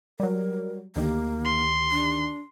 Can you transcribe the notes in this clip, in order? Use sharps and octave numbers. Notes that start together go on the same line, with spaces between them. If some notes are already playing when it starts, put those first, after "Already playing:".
F#3 G3 A#4
D2 D#3 A#3 G4
C6
D4